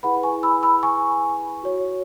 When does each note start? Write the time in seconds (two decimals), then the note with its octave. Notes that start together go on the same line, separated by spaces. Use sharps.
0.03 E4 G#4 B4 F#5 B5
0.23 G#5 C#6
0.43 B5 E6
0.63 B5 E6
0.83 G#5 C#6
1.63 F#4 C#5